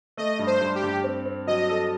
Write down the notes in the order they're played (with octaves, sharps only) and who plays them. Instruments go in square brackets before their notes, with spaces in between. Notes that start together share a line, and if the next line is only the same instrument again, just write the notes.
[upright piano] A3 [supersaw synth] D#5
[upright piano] G2
[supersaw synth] C5
[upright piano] G2
[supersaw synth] G4
[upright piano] G2
C4
C4
[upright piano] F#3 [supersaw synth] D#5
[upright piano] A4